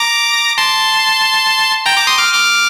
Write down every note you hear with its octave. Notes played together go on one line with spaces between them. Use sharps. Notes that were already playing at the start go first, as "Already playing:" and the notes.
Already playing: A#5 D6
A5 C6
G5 A#5
A#5 D6
C6 D#6
D6 F6
D6 F6